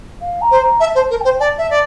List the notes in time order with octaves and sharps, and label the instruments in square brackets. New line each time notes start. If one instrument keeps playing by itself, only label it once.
[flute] F5
A#5
[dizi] C5
[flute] A#5
[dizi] E5 [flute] A5
[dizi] C5
[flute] A5
[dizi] A#4
[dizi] C5 [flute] G5
[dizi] D5 [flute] A5
[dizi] E5
D5